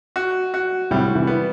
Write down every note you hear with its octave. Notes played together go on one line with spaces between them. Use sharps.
F#4
F#4
A2 C3 G3
C3 E3
B3